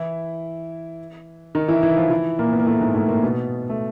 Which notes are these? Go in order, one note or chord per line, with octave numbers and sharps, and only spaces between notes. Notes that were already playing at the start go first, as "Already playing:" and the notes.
Already playing: E3 E4
D#3 D#4
E3 E4
E3 E4
F3 F4
E3 E4
A#2 A#3
B3
A#3
A2 A3
G#2 G#3
A2 A3
A#2 A#3
B2 B3
A3